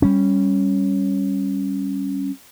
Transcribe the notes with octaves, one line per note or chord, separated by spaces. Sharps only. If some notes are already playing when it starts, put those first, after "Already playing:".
G3 C#4